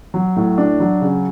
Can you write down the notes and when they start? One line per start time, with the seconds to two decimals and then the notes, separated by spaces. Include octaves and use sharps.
0.14 F#3
0.36 A2
0.58 D4
0.80 F#3
1.02 C#3